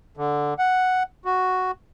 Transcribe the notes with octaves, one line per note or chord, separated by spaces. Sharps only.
D3
F#5
F#4